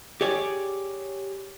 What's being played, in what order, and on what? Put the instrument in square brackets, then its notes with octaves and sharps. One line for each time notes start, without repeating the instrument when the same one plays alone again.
[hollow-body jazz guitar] G4 G#4 C#5 D5